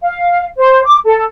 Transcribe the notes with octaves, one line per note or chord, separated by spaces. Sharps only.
F5
C5
D6
A4